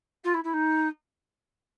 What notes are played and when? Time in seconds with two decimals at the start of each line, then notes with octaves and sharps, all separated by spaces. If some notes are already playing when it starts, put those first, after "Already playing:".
0.24 F4
0.33 E4
0.43 E4
0.53 D#4